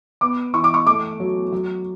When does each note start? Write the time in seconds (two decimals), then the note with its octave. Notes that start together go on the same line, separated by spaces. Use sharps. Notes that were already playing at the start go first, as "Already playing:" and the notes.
0.21 B3 D6
0.54 E3 C#6
0.64 D6
0.74 C#6
0.86 A3 D6
1.20 F#3
1.52 F#3